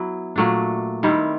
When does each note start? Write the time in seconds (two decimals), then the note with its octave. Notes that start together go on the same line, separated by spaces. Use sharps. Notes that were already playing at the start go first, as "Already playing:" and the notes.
Already playing: F#3 B3 E4
0.36 A#2 F#3 A3 D4
1.03 D#3 G3 C4 E4